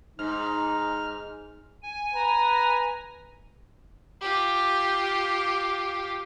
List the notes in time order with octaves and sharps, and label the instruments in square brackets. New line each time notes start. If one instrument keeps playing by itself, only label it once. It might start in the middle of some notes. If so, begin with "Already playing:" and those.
[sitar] G#2 [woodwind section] D#4 [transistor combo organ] F6
[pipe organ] G#5
[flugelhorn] B4 [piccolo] A#5
[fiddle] F4 G4